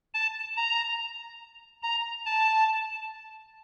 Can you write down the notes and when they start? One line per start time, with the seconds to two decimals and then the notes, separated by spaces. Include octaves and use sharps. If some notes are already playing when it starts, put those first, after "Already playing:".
0.14 A5
0.57 A#5
1.83 A#5
2.26 A5